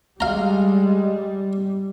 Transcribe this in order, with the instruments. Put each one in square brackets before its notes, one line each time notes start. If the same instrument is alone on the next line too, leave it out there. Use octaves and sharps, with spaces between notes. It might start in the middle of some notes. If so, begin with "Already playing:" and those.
[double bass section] G3 [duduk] G#3 [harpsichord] F5 A#5